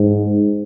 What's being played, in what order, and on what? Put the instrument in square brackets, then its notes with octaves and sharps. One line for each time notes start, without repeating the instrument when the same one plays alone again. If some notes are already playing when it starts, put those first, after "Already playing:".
Already playing: [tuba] G#2